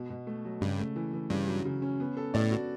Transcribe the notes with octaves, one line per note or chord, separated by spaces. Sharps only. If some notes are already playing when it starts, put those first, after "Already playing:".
Already playing: B2
B2
A3
F#3
G2 C#3
A3
E3
E3
G2 C#3
F#3
C#3
C#4
B3
A4
A2 D5
F#4